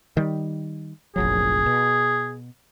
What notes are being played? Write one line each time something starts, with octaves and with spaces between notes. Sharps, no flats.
D#3 G3
F1 A#1 F#3 G#4
B2